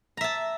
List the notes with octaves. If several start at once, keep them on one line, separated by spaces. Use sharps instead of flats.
E5 A5 A#5